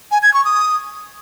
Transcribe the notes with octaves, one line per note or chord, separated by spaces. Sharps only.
G#5
G#6
C#6
D#6